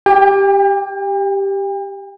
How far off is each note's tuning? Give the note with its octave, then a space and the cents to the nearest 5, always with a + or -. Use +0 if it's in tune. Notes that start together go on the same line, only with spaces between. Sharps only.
G4 +0 G5 +40